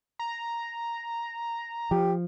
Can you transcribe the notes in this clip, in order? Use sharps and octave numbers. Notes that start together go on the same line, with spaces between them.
A#5
F3 G4